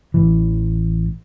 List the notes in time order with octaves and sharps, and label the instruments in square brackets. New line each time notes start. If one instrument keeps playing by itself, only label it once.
[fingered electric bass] A1 E3